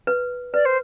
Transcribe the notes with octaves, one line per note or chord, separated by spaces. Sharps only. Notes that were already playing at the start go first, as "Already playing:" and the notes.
B4
B4 D5
C5